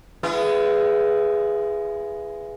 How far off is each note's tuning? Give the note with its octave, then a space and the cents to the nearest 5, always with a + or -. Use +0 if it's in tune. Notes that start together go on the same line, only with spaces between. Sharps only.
G#3 +0 B3 +0 E4 +40